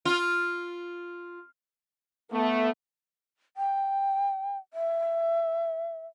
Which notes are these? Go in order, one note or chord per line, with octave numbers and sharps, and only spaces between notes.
F4
A3 B3
G5
E5